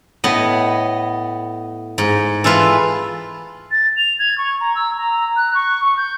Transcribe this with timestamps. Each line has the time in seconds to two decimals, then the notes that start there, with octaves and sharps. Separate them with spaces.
0.24 A2 B3 D#5
1.98 G#2
2.44 E3 F4 A4 B4
3.71 A6
3.97 F7
4.19 G#6
4.38 C#6
4.60 A#5
4.75 E6
4.97 A#5
5.37 F#6
5.55 C#6
5.85 C#6
5.97 G6